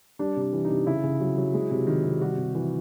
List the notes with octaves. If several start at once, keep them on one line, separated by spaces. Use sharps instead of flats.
G3 D4
C3
D4
E3
D#4
C3
C#3 E4
C#3
F#3
F#3
G#3
C3
D#3
C3
G3 F#4
C3
E3